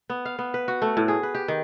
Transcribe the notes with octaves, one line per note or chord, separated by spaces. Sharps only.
B3
F5
B3
B4
F#4
A3
A2
G#4
B4
G4
D#3